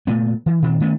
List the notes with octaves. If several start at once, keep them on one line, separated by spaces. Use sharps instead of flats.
A#2 A3 B3
E3
A#2 D#3 C4
D#3 A3 B3 C#4